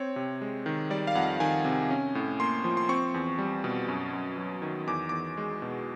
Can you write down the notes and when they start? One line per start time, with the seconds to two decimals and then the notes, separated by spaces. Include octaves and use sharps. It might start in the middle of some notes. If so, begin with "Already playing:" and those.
Already playing: C4 C#5
0.16 C3
0.41 G#3
0.66 D#3
0.90 G3 D5
1.07 F5
1.15 F2 F#5
1.40 D#3 G#5
1.65 C3
1.90 C#4
2.15 A2
2.40 A#3 C6
2.64 F3
2.77 C6
2.89 C4 C#6
3.14 E2
3.39 G3
3.64 B2
3.89 F#2
4.13 F#2
4.38 F#3
4.62 D#3
4.87 E2 D6
5.09 E2 D6
5.37 G#3
5.62 B2